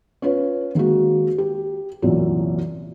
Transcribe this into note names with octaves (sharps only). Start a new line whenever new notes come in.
C#4 F4 B4 C#5
D#3 G#3 A#3 F#4
G4
C2 F#2 A#2 E3 F#3